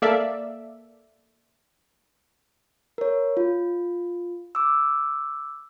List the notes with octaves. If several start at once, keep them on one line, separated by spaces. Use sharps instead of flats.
A#3 A4 D5 E5 F5
A#4 C#5
F4
D6 E6